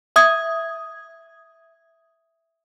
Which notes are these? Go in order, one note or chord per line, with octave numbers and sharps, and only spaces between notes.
E5 D#6 G#6